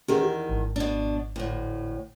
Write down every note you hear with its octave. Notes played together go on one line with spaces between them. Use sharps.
E2 D#3 C#4 G4 G#4
G4
G#1
B2 D4
D2 A2